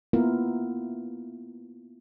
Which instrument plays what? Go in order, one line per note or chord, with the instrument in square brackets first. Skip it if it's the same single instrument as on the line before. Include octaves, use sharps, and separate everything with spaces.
[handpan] A#3 B3 E4 F4 A#4